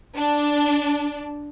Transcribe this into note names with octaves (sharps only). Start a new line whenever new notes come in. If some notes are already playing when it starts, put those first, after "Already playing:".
D4